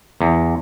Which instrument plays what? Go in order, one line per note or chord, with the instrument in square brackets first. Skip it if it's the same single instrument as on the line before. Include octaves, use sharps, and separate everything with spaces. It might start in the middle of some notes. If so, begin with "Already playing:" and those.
[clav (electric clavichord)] E2